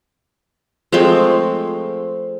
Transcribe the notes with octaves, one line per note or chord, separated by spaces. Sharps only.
F3 G#3 A3 C4